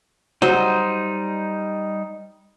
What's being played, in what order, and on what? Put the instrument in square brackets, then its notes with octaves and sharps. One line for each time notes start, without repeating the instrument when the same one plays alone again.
[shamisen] F#3 [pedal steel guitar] G3 D#4 [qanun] C5